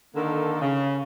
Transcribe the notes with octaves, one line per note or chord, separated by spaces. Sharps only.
D3 D#3 A#3 A4
C#3